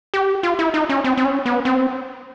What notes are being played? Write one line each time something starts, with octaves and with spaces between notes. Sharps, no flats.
G4
F4
E4
D#4
C#4
C4
C4
C#4
B3
C4